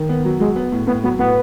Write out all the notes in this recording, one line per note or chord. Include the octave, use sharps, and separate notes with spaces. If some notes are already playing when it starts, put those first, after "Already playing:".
Already playing: D#3
B3
F#3
F#3 G#3
B3
A2
A2 B3
F#3 B3
A2 B3